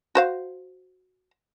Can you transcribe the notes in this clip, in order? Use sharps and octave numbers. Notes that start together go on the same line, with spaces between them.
F#4 C5 F5